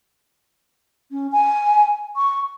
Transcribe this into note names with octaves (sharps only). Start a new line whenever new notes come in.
C#4
G#5
C#6